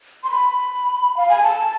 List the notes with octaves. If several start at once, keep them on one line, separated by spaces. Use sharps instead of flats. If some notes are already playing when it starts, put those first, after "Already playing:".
C6
B5
F5
G#5
A5